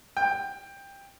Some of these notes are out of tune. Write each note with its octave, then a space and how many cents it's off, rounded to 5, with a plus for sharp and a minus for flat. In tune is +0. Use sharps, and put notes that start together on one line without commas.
G5 +15